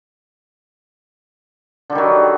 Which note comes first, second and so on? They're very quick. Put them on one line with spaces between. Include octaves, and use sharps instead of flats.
D3 G3 D#3 F#3